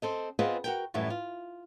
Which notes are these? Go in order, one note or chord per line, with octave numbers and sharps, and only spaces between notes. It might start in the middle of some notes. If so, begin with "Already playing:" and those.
C4 A4 D#5
B3 C4 F4 G#4 B4 D#5
F#4 A#4 G5
F#2 A2 E3 G3
F4